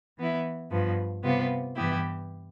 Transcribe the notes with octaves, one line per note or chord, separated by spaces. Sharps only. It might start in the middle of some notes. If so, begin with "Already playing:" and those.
E3 B3 E4
G2 F3 B3
C3 G3 B3 F4
G2 E3 B3 E4 G4